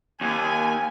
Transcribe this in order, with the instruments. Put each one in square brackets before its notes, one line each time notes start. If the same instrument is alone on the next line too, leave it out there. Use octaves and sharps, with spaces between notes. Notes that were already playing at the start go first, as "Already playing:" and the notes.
[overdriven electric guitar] D#2 [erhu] G#5